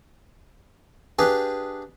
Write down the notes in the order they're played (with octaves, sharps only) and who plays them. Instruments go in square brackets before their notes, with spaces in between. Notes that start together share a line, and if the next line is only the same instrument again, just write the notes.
[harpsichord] D4 G4 G#4 B4 F5 G5